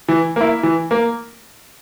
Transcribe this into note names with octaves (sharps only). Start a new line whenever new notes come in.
E3
A#3 E4
E3
A#3